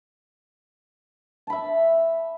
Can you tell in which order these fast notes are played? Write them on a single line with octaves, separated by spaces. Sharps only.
A5 B5 E5